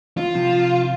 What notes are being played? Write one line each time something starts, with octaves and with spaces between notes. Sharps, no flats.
F4
C3 F3